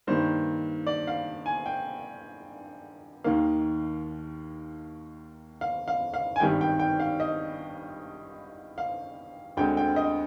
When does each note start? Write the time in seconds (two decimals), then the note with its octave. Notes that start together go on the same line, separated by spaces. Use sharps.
0.07 G2 D#3 A#3 C5
0.87 D5
1.07 F5
1.46 G#5
1.66 G5
3.24 D#2 D#3 A#3 F5
5.61 F5
5.88 F5
6.14 F5
6.36 G#5
6.40 G#1 G2 D#3 G3 G5
6.61 G5
6.79 G5
7.00 F5
7.20 D#5
8.78 F5
9.57 D2 D3 G#3 C4 G5
9.77 G5
9.96 D#5